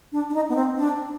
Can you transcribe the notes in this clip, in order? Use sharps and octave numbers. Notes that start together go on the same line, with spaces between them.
D4
D4
D#4
B3
C4
D4